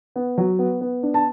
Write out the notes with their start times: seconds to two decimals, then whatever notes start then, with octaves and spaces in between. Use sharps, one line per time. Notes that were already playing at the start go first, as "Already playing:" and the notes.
0.16 B3
0.38 F#3
0.59 B3
0.81 B3
1.03 D4
1.14 A5